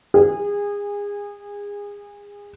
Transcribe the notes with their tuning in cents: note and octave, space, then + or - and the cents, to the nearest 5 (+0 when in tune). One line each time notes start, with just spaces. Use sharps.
G#4 -25